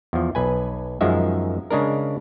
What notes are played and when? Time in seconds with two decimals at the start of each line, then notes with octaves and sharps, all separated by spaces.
0.13 E2 F3
0.35 B1 B4 G#5
1.01 F#2 D#3 F3 G#3 E5
1.71 C#3 G#3 D4 A#4